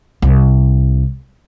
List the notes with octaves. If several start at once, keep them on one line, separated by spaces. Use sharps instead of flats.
C2